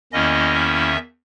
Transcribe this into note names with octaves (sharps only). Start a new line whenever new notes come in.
E2 D#3 A#3 C#4 E4 D#5
E5